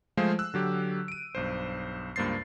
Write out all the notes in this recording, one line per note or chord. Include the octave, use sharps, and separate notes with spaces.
F3 G#3 A3 G#4 C5 F5
E6 F#6
D3 F#3 G4
D7 D#7
B1 G2 C5
C#2 G2 A#3 C5 A6 C7